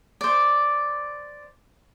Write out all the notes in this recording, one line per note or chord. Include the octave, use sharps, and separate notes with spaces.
C5 D5